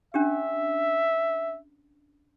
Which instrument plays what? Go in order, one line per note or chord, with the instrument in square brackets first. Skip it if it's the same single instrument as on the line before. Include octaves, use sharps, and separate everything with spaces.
[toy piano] C#4 D4 G4 [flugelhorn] E5